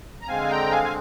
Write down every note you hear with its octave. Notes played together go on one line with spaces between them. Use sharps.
A#5
D3 G#3 C4 F5 G#5
G5 A#5
F5 G#5
G#5